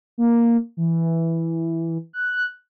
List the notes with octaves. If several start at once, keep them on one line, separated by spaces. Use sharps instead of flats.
A#3
E3
F#6